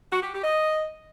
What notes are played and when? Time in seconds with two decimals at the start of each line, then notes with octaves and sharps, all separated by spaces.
0.11 F#4
0.21 G4
0.32 G4
0.43 D#5